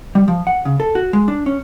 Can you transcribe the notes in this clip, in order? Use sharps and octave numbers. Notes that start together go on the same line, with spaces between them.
G3
F3
F#5
C#3
A4
F#4
G#3
D4
C#4